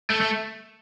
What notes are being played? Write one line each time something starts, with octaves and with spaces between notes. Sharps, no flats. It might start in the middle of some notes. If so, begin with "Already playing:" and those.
A3
A3